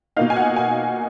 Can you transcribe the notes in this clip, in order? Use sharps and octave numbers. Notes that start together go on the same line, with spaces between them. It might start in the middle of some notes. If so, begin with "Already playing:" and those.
B2 A#3 D#4 F5
G#5
F#5
G#5